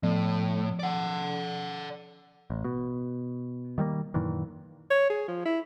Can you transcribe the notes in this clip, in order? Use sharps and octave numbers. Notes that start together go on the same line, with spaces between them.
A2 F3
D5 F#5
A1
B2
D#3 G3 G#3 A#3
F#2 A#2 D#3 E3
C#5
G#4
F3
E4